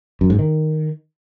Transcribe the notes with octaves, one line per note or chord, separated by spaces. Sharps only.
F#2
G#2
D#3